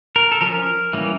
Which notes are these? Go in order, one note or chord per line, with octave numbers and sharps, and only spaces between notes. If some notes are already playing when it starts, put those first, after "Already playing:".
A#4
A4
F3 C#4 A#4
E3 G3 A#3 C#4